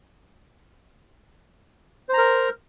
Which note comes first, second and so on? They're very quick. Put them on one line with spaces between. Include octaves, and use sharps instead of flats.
C5 A#5 A#4